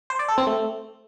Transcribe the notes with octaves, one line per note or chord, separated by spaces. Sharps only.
C5
D5
A4
C4
A3